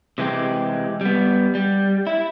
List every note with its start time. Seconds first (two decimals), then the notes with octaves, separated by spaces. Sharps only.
0.18 C3 E3 G#3 G4
1.01 G3 B3
1.55 G3
2.07 E4